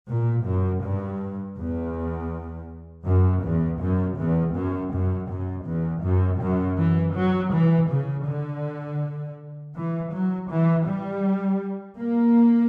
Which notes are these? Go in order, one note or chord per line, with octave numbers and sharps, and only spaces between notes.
A#2
F#2
G2
E2
F#2
E2
F#2
E2
F#2
F#2
F#2
E2
F#2
F#2
E3
F#3
E3
C#3
D3
E3
F#3
E3
G3
A#3